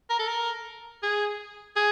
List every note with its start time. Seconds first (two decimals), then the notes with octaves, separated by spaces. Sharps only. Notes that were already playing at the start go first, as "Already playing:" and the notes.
0.10 A#4
0.19 A4
0.27 A#4
1.03 G#4
1.76 G#4